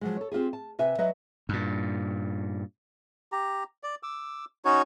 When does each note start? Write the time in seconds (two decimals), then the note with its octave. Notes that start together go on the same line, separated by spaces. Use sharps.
0.01 F3 F#3 G#3
0.17 A4 C#5
0.32 C4 F4 G4 G#4
0.53 A5
0.79 C3 B4 E5 G#5
0.98 F#3 B4 D#5 E5
1.49 G2 A#2
3.32 G4 A#5
3.83 D5
4.03 D6 E6
4.65 C#4 D#4 F#4 C#5